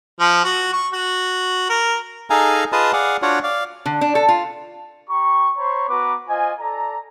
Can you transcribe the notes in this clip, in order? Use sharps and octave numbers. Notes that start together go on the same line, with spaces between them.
F3
F#4
C#6
F#4
A#4
D#4 G#4 A4 F5 G#5 A#5
F4 G#4 B4 D#5 A5 D#6
G#4 D5 F5 F#5
D4 F4 F#4 C#5 F#5
D5 F5
D3
D4
A4
F4
G4 A#5 C#6
C5 C#5 A#5 B5 C#6
B3 F#4 B4 A#5 D6
F4 C5 D#5 G#5
A4 D5 A#5